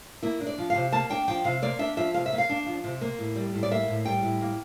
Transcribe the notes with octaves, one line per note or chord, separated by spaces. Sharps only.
A#3 E4
D4
D5
F3
C3 F5
A#3 A5
D4 G5
F3 G5
C3 F5
A#3 D5
D4 E5
F3 E5
C3 F5
E5
A#3
F5
D4
F3
C3
A#3
A2
G3
A2
D5
A#3 E5
A2
G3 G5
A2
A#3